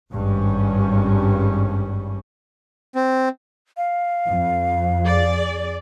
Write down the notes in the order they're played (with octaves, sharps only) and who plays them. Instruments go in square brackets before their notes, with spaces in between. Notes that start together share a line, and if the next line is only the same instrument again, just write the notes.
[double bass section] G#1 G2 G3 C#4
[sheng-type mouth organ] C4
[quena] F5
[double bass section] F2
[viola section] G#4 D5